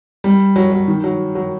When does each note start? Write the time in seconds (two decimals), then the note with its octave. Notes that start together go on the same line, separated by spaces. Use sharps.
0.24 G3
0.56 F#3
0.72 F#3
0.88 D#3
1.04 F#3
1.35 F#3